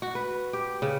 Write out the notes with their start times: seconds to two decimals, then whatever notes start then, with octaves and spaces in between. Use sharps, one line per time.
0.02 F#4
0.15 B4
0.53 G4
0.82 C#3